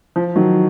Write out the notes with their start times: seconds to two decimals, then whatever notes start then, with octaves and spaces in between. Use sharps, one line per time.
0.16 F3
0.36 D#3 F#3